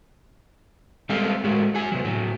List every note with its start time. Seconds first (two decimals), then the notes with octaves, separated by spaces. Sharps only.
1.09 G3 G#3 C4 A4 D#5 F5
1.44 A2 G#3 F#4
1.75 F#4 G#5
1.92 C3 F#3
2.05 A2 F#3